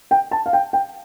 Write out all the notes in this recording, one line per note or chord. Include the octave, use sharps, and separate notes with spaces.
G5
A5
F5
G5
G5